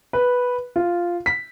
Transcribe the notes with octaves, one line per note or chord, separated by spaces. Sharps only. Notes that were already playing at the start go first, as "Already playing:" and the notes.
B4
F4
B6